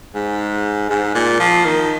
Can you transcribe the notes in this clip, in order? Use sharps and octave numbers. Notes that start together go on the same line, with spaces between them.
G#2
G#2
A#2
F3
D#3